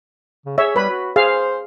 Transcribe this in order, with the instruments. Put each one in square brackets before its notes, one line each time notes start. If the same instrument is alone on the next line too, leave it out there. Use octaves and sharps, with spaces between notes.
[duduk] C#3
[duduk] G#4 [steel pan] C#5 E5
[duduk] G3 [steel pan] B4 B5
[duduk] F#4
[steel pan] G#4 F5 [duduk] C5